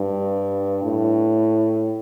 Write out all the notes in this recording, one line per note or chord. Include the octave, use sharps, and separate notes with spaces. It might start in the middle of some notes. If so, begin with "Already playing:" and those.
Already playing: G2
A2